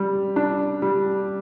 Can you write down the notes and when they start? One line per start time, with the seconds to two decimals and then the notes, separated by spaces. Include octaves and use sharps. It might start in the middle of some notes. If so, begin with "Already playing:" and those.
Already playing: G3
0.36 D4
0.82 G3